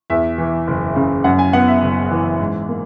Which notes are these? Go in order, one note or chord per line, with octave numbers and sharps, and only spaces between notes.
E2 E5
E3
F#1
C#3
F#2 F#5
G#5
B3 F#5
E5
F#1
E3
G#2
A#3